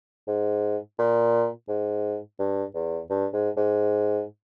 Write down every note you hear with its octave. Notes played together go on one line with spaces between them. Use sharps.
G#2
A#2
G#2
G2
E2
G2
G#2
G#2